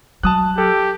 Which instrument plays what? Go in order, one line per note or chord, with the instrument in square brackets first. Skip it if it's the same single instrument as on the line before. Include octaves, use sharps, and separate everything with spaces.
[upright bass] F#3 [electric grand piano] A5 D#6 F#6
[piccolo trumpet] G4 [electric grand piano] A4